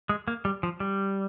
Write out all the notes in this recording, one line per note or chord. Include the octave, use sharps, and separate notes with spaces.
G#3
A#3
G3
F3
G3